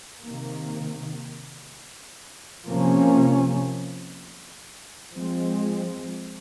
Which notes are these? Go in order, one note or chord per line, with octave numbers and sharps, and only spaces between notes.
C3 D#3 A#3
C3 F3 A#3 C#4
F3 G#3 C4